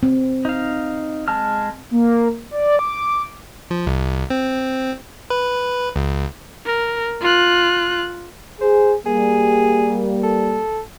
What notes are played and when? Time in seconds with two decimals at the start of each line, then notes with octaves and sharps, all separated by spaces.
0.03 C4
0.45 D#4 F5
1.28 G#3 A5 F6
1.91 A#3
2.51 D5
2.79 D6
3.71 F3
3.87 C2
4.30 C4
5.30 B4
5.96 C#2
6.66 A#4
7.21 F4 F#6
8.61 G#4 C5
9.06 G3 A#3 G#4
10.24 A4